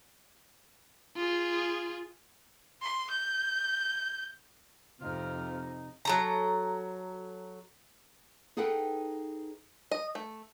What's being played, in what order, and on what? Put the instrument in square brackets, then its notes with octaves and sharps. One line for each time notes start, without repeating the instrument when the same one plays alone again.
[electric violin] F4 G#4
[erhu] C6
G6
[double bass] F2 [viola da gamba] C3 [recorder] D#4 [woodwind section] F4 F6
[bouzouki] F#3 A4 A#5
[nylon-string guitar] D#4 G#4 A4 B4 F#5 G5
[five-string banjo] D#5
A3